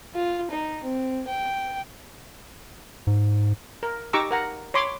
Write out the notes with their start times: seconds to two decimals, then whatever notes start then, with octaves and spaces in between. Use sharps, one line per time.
0.14 F4
0.51 D#4
0.84 C4
1.28 G5
3.07 G#2
3.83 A#4
4.13 D#4 G4 A#5 C#6 D6 E6
4.31 A#4 F#5 A#5
4.74 C#5 B5 C6 D6